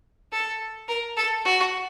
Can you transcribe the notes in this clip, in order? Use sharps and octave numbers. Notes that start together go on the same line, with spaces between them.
A4
A#4
A4
F#4